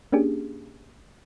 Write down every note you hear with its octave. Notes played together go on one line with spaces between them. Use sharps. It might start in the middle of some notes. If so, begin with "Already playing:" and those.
A#3 C#4 D4 G4 G#4